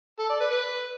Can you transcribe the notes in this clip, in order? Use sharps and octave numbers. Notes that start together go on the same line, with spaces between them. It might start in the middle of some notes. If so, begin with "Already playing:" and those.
A4
D5
B4
B4